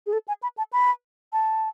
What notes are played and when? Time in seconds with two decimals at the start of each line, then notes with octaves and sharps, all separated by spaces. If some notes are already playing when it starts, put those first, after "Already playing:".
0.06 G#4
0.13 A4
0.28 G#5
0.43 B5
0.58 A5
0.73 B5
1.33 A5